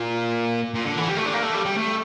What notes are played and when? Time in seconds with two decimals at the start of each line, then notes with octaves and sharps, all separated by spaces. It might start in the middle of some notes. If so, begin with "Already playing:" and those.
Already playing: A#2
0.74 A#2
0.85 D3
0.97 E3
1.08 G3
1.17 A3
1.26 D4
1.34 A#3
1.43 A3
1.54 G3
1.66 G3
1.78 A3